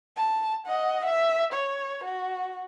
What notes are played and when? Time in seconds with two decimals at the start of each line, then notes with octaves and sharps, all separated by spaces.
0.16 A5
0.67 D#5 F#5
1.05 E5
1.53 C#5
2.04 F#4